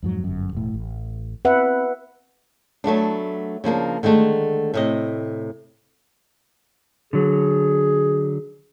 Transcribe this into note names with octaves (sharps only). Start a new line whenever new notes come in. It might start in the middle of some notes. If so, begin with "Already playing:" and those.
F2 G#2 F#3
G1 F#2
E1 A2
A1
C4 B4 E5 F#5
F#3 A3 B3 D4
C#3 F3 A#3 D4
D3 D#3 G#3 A3
A2 C3 D#5
D3 F#3 G#4